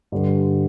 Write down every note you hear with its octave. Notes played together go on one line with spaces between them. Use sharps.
G2 D3 G3